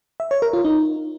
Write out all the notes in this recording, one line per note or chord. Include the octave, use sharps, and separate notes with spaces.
E5
C#5
A#4
F4
D#4